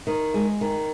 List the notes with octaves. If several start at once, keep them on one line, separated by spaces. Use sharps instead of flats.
D#3
G#3
D#3